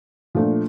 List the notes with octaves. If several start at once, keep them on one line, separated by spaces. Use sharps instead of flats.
A#2 F3 A3 D4